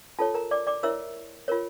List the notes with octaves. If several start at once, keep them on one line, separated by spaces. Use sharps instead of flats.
F4 A4 C#5 A5
A#4 A#5
D5 D6
D5 D6
E4 A#4 C#5 E5 E6
F4 A#4 C#5